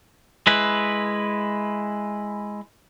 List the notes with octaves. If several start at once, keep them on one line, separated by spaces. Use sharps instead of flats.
G#3 E4 B4